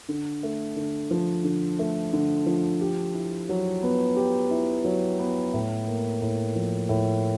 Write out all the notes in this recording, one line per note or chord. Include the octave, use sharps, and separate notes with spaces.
D3
A3
D3
F3
D3
A3
D3
F3
G4
E4
F#3
B3
G4
E4
F#3
B3
A2
A#3
A2
F3
A2